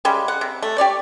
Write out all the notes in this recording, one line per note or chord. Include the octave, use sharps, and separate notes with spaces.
C#3 G3 G#3
F#5
C3
A3
G4 C#5 D5